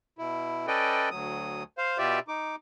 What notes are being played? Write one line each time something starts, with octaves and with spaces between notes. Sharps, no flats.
B2 E4
C#4 A4 B4 D5 D#5 G5
D2 F#3 D#6
C5 F5
B2 F4 G4 D5 E5
D#4 D6